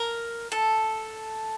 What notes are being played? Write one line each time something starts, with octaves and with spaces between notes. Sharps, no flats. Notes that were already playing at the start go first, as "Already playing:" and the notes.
Already playing: A#4
A4